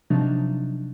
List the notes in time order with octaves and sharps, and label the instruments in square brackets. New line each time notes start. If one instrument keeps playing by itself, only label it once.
[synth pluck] C3 F3 F#3 D4 D#4